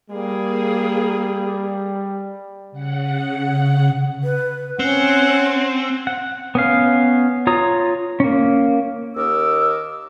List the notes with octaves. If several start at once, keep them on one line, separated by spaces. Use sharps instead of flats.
G3 A#3 G#4
C#3 F#5
B4
C4 C#4 F#5
F#5
B3 C#4 F5
F4 C#5 A#5 D#6
A#3 C#4
D#2 A#4 D#5 D6 E6